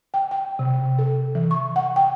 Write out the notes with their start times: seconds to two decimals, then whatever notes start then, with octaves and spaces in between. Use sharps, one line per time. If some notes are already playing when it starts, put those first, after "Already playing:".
0.14 G5
0.31 G5
0.59 C3
0.99 A4
1.35 E3
1.51 C#6
1.76 F#5
1.96 G5